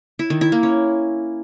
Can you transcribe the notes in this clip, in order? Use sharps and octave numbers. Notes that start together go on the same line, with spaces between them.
E4
D#3
E4
A#3
C#4